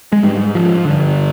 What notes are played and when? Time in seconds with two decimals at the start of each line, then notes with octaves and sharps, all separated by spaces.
0.13 G#3
0.23 G#2 G3
0.55 F3
0.85 G2 D3